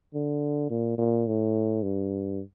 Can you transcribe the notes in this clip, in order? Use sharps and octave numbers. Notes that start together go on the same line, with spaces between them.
D3
A#2
A#2
A2
G2